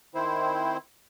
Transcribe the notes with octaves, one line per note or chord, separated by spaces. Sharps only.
D#3 C4 E4 C5